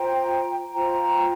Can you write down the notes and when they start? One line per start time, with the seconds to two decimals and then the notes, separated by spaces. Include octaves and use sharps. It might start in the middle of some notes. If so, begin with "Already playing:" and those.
Already playing: F4 C5 G5 A#5
0.73 F4 C5 G5 A#5